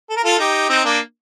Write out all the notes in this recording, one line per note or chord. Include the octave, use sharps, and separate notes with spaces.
A4
A#4
F4 A4
D#4 G4
C4 D#4
A#3 D4